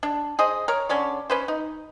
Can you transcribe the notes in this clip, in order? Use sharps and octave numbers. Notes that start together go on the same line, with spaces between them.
D4
G#4 C5 D#5
A#4 C#5
D3 C#4 C#5 D5
C#4 B4 C5
D#4